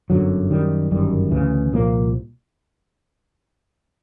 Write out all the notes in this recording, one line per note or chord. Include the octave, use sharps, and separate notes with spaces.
G1 F#2 D3 F#3
F#2 D#3 G3
G1 F#2 D#3 G3
D2 C#3 E3
C2 A#2 F3 A#3